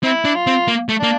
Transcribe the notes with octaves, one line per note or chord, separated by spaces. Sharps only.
C4 E4
D4
F4
C4
A#3
A3
A#3 D4